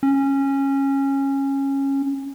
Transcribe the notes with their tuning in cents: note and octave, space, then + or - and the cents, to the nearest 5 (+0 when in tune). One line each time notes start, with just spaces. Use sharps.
C#4 -15